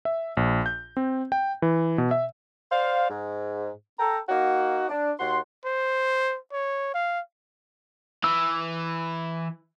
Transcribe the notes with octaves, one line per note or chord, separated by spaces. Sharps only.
E5
A#1
G6
C4
G5
E3
B2
E5
C5 D5 F5
G#2
A4 G5 A#5
A#3 D#4 F#4
D4
D#2 F#4 C6
C5
C#5
F5
E3 E6